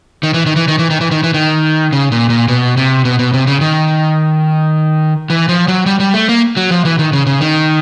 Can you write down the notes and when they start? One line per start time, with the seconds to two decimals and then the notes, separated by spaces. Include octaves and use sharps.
0.23 D#3
0.34 E3
0.46 D#3
0.56 E3
0.68 D#3
0.79 E3
0.90 D#3
1.01 E3
1.11 D#3
1.23 E3
1.34 D#3
1.93 C#3
2.12 A#2
2.30 A#2
2.48 B2
2.77 C3
3.05 B2
3.19 B2
3.33 C3
3.47 C#3
3.61 D#3
5.30 E3
5.49 F3
5.68 F#3
5.86 G3
6.00 G3
6.14 A3
6.29 A#3
6.57 F#3
6.71 F3
6.85 E3
6.99 D#3
7.13 C#3
7.26 C#3
7.41 D#3